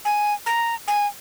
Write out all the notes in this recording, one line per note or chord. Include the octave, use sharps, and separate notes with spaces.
G#5
A#5
G#5